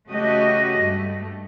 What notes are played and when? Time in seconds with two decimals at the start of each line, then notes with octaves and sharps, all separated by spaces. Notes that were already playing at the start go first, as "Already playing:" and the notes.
0.10 C#3 A3 F#4 G4 D#5
0.79 G2 A3